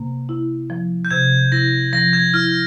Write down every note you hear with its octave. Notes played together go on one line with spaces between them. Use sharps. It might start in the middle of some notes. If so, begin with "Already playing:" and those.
Already playing: C3 A#3
E4
F3
G6
C3 G#6
E4 A#6
F3 A#6
G#6
E4 F6